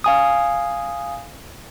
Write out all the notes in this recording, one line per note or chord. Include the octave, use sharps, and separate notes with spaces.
F5 G#5 D#6